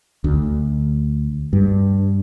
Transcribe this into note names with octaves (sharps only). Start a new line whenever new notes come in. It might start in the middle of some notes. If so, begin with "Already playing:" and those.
D2
G2